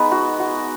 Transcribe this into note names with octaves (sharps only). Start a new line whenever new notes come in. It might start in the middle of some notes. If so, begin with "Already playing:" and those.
Already playing: G#3 B3 D#4 B4
F#4
F#4